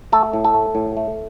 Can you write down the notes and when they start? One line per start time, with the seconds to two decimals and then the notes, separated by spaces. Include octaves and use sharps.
0.12 A3 A4
0.33 A2
0.45 A4
0.54 A3
0.75 A2
0.97 A3